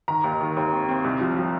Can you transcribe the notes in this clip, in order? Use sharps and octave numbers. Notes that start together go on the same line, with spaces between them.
D#3 A#5
D#2
D#3
D#2
C4
C4
C2
F3
F3